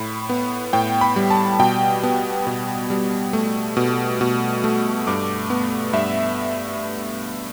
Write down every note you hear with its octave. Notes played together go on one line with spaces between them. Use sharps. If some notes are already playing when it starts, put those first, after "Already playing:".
Already playing: A2 B5
B3
A2 G5
B5
G3
A5
B2 G5
B3
B2
G3
A3
B2
B2
A3
G2 D6
B3
G2 E5